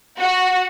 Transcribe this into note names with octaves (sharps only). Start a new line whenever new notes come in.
F#4